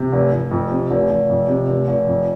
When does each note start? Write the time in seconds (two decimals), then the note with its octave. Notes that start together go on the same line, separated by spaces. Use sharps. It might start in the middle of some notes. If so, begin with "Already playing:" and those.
Already playing: C3
0.13 F1
0.32 F1
0.51 F2
0.71 C3
0.91 F1
1.10 F1
1.29 F2
1.48 C3
1.68 F1
1.88 F1
2.07 F2